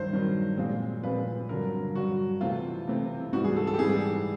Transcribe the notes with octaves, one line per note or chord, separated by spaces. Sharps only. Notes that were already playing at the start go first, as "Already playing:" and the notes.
Already playing: G2 D#3 F#3 C5
G2 D#3 F#3
A#2 F3 G#3 C4
A#2 F3 G#3 C4 B4
G2 D3 F#3 A#4
G2 D3 F#3 F#4
C3 E3 A3 C4 F4
C3 E3 A3 C4
G#2 E3 G3 F#4
G#4
A4
A4
G4
G#2 E3 G3 G#4